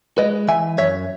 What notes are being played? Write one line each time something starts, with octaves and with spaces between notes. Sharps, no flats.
G#3 B4 D#5
E3 E5 G#5
F#2 C#5 E5